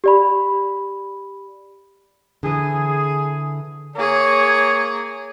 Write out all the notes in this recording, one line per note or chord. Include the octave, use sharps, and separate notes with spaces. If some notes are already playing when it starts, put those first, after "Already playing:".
G4 D5 B5
D3 E3 G#4
A#3 G#4 C#5